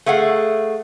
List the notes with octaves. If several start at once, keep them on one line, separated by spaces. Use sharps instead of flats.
A3 G#4 F5 F#5